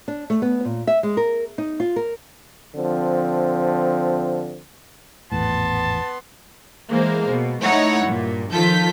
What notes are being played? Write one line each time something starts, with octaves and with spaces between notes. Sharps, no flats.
D4
A3
B3
A#2
E5
G#3
A#4
D#4
F4
A#4
D3 F3 C4
G#1 E2 A2 B3 A5 C6
E3 G#3 A#3 C5
B2
A3 D#4 E4 C#5 F#5
G2 A#2
D#3 F3 F4 A4 G6 B6